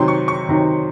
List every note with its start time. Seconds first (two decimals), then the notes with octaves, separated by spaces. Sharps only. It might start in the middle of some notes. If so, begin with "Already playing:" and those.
Already playing: C3 D#3 F#3 C6
0.08 C#6
0.28 C#6
0.49 C3 D#3 F#3